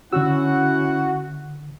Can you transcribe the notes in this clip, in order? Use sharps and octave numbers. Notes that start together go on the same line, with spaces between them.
D3 C#4 E4 F#4 F#5 E6